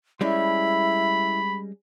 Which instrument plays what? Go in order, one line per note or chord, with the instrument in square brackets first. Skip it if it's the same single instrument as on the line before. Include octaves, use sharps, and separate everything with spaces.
[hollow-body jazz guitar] G3 G#3 C#4 [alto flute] E4 [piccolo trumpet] B5